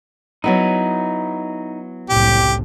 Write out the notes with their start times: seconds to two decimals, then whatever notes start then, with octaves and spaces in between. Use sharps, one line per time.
0.44 F#3 B3 D#4 E4
2.10 F#1 C2 A2 G4